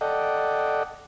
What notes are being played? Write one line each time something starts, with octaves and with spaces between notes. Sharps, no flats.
A4 D5 D#5 F#5 G5